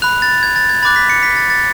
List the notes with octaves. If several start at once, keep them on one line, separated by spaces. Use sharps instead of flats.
B5 F#6 F7
A6
G#6
A6
G#6
B5 D6 F#6 A6
B6
C#7
B6
A6
A6